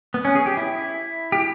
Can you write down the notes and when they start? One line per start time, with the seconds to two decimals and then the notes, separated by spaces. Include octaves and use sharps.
0.14 B3
0.25 C#4
0.35 G#4
0.46 G4
0.57 E4
1.32 G4